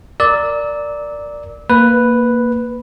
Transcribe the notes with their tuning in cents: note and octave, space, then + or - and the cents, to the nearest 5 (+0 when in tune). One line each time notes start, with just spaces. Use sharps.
A#4 -5 D5 +0 E6 -30
A#3 +0 B4 +0